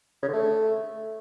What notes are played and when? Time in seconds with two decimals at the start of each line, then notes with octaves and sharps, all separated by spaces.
0.23 C#3
0.28 D3
0.34 A3